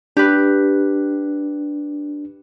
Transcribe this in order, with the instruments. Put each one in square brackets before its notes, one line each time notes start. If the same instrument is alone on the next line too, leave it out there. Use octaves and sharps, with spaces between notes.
[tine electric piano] D4 [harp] G4 B4